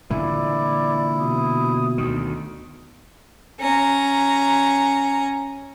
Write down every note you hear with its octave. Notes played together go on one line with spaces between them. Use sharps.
A#2 D3 E3 E4 D5
B2 D#6
D2 D#3
C#4 A#5